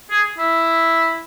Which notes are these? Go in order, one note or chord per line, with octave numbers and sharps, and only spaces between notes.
G#4
E4